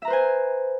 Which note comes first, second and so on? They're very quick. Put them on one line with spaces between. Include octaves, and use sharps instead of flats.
E5 A#5 B4 C5 G#5